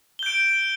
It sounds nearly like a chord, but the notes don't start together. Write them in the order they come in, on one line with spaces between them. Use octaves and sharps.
G7 G6 D7